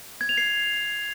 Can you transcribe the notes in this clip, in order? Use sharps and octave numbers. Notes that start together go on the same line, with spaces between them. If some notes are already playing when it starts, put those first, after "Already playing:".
G#6
F7
C7